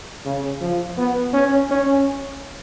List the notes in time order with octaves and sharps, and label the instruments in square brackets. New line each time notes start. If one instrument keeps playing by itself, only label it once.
[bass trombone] C#3
F3
B3
C#4
C#4